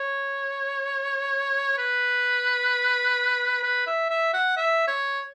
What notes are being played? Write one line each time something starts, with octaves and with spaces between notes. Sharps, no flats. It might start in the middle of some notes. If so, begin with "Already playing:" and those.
Already playing: C#5
B4
B4
E5
E5
F#5
E5
C#5